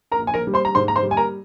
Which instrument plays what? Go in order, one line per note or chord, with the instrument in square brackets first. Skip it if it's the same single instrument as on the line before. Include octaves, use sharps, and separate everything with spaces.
[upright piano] A#4 A#5
A#1
G#5
A#4 A#5
G3
C5 C6
A#5
G#2 C5 C6
A#5
C5 C6
G3
G#5
A#4 A#5